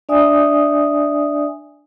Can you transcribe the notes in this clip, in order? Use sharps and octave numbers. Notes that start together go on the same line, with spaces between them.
D4 D5 E5 G#5 D#6